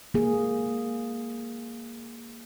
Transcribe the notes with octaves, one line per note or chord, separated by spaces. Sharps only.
A#3 G#4